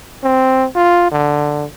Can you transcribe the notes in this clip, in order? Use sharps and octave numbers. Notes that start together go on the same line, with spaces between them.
C4
F4
D3